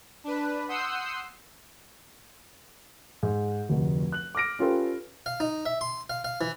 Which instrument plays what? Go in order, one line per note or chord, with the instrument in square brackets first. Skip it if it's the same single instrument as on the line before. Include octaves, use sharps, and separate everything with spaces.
[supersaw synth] D4 B4
F#5 C6 D#6 E6 G6 C7
[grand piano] G#2
F1 D2
F#6 F#7
D6 F6 A#6 D7
C#4 F4 G4 A4 B4
[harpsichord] F5
D#4
E5
C6
F5
F5
E3